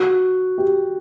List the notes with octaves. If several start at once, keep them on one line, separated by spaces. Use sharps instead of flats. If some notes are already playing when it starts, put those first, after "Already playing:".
Already playing: F#4
G4